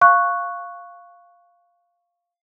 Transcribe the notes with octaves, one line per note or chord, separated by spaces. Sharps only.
F5 C#6 F#6